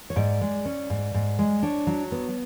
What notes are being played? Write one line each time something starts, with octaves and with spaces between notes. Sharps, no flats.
C#5
G#2 D5
G#3
C#4
G#2
G#2
G#3
D4 C#5
F#3
B3